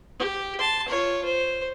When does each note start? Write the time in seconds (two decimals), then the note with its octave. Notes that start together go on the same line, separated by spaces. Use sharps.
0.20 G4
0.59 A5 C6
0.88 F4 C#5
1.25 C5